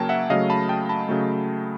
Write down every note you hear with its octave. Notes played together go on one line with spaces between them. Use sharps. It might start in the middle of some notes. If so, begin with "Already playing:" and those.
Already playing: C#3 F#3 A#3 A#4 C#5 G5 A5
E5 F#5
C#3 F#3 A3 D#5 F5
A5 B5
G5 A5
A5 B5
C#3 F#3 A3